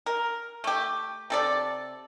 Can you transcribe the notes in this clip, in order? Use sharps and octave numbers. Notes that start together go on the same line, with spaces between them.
A#4
A3 G4
C3 A4 D5